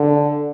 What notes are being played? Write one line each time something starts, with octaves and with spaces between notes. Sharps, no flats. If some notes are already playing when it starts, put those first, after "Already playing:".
Already playing: D3